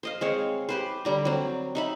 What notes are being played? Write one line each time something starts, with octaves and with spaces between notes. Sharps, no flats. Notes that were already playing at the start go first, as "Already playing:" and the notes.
C5 D#5 F5
G#3 C4 C#5
G4 B4 C5
D3 G3 A#5
F#3 C4
D#4 E5 B5